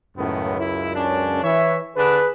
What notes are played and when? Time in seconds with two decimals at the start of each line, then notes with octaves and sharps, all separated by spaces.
0.17 C#2 F#2 A2 D#3 B3
0.58 E4
0.94 C#4 D4
1.43 E3 C#5 E5
1.97 D3 D4 G#4 B4